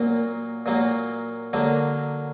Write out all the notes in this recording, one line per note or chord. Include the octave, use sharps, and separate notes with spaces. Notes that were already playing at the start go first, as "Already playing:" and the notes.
Already playing: A#2 F#3 A#3
A#2 F#3 A#3
D3 F#3 A#3